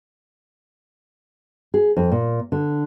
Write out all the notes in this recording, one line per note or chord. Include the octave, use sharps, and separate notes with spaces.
G#4
F2
A#2
D3